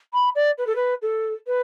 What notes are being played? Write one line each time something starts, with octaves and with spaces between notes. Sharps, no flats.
B5
D5
B4
A4
B4
A4
B4